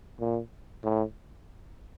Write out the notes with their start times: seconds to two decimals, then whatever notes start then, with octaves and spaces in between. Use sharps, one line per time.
0.20 A#2
0.83 A2